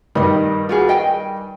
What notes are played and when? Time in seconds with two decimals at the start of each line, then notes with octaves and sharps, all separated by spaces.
0.15 G2 D#3 G3 D#4 D#5
0.69 F4 F#4 G#4
0.89 D#5 G5 G#5